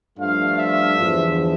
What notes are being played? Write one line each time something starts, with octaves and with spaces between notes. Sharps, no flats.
G2 F3 A3 D4 F4 F5
E5
E2 D3 F3